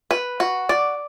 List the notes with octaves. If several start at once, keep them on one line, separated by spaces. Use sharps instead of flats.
B4
F#4
D5